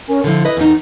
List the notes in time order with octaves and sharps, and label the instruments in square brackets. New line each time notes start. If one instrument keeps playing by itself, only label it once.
[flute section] C#4 A#4 G#5
[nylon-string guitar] D3 F3 [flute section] E4
[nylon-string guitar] B4 D#5
E2 D#4